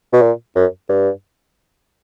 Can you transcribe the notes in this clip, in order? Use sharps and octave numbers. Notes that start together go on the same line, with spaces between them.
B2
A#2
F#2
G2